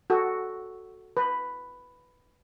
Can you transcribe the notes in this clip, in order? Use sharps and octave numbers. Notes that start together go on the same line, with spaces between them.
F#4 A4
B4